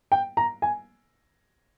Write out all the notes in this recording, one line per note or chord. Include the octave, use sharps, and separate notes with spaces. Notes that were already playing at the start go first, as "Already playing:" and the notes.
G5
A#5
G#5